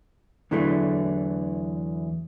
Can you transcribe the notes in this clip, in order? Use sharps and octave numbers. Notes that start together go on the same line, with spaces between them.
E2 D3 E3 F#3 A3